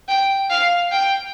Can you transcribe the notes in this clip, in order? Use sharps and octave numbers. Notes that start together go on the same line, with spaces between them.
G5
F5
G5